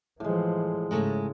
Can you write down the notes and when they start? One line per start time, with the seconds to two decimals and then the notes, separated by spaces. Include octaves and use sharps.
0.20 A2 E3 F3 G#3
0.91 G#2 C#3 G#3 A3